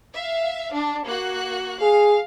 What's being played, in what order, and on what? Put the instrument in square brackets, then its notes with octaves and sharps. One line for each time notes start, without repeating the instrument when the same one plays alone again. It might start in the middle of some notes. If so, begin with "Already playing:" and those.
[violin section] E5 F5
D4
A#3 F#4 F#6
[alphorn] G#4 [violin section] F5